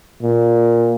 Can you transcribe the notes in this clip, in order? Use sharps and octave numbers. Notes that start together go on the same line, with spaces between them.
A#2